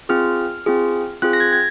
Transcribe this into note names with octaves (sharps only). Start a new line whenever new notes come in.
C4 F4 G#4 F6
C4 F4 G#4
C4 F4 G#4 F#6
A#6
G#6
G#6